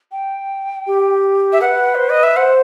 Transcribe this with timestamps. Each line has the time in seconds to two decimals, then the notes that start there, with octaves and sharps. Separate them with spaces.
0.11 G5
0.87 G4
1.52 E5
1.61 B4 F#5
1.95 C5
2.09 D#5
2.23 E5
2.36 C5 F#5